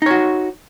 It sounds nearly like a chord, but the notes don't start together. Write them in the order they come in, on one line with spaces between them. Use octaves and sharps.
D#4 C#5 F#4